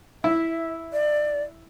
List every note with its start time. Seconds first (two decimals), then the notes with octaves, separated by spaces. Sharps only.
0.24 E4 E5
0.93 D5